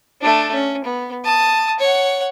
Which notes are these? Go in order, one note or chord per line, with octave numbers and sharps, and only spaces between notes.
A3 D4
C#4
B3
A5 D#6
C#5 F#5